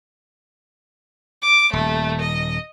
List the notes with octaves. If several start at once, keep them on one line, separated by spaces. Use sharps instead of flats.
D6
D#1 A3
D#5